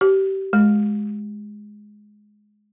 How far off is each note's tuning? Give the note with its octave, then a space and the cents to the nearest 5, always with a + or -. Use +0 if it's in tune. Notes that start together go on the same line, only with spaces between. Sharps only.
G4 -25
G#3 +10